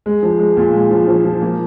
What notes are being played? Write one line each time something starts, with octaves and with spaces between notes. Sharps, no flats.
G#3
F3
G#3
A#2
G#3
F3
F3
F3
A#3